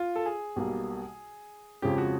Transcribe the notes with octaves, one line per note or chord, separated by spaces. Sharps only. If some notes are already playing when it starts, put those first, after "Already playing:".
Already playing: F4
A4
G#4
B1 B2 G3 A#3
F2 C#3 F3 G#3 C#4 G4
F#4